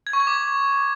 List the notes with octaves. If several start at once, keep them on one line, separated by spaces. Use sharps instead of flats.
G#6
C#6
G#6
D6